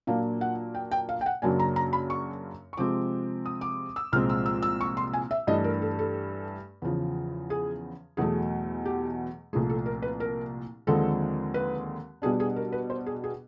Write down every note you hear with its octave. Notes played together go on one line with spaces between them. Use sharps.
A#2 F#3 A#3 D4 F5
F#5
G5
G5
F5
G5
F#5
F#2 C#3 F#3 A#3 D4 G#5
A#5
A#5
B5
C#6
C#6
C3 F3 G#3 C4 D6
D#6
D6
E6
C2 A#2 F3 G#3 C4 F6
E6
E6
E6
C#6
C6
G#5
E5
G2 E3 A3 D4 D#5
A#4
A4
A4
E2 C#3 F3
G#4
E2 B2 F#3 A3 G#4
G4
C2 A#2 F3 A3 G#4
A4
A#4
B4
A#4
D#2 D3 F3 G#3 C4 A4
B4
B2 G3 B3 D4 G#4
G#4
A#4
B4
C5
G#4
G#4